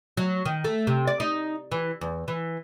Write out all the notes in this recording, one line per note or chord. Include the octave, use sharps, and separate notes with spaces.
F#3
D#3
A3
C3
D5
D#4
E3
E2
E3